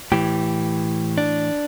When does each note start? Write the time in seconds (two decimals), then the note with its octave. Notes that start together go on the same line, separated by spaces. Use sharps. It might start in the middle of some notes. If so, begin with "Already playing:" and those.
0.12 A2 E3 G4
1.18 D4